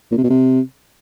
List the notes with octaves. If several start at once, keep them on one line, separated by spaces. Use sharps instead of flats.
A#2
C3
B2
C3